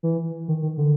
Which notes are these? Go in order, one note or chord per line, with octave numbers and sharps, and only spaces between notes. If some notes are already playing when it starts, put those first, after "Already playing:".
E3
D#3
D#3
D3